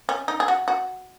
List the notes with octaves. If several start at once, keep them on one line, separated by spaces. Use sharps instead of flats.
C#4
D#4
G#4
F#4
F#4